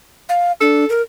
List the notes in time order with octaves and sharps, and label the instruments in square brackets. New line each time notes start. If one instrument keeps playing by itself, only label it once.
[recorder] F5
[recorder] D4 [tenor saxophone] A4
[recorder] A#4